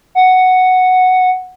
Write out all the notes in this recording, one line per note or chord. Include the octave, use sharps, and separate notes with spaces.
F#5